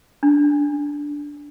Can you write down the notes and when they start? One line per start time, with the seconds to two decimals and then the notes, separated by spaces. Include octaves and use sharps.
0.23 D4